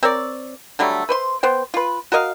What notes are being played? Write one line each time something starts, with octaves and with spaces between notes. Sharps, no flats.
C4 A#4 C#5 D5
D3 F#3 G3 A3
B4 C5 C6
B3 C5 G5
F4 B4
F#4 A#4 D#5 F5